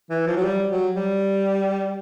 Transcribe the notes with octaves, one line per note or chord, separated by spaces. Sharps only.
E3
F3
F#3
G3
F#3
G3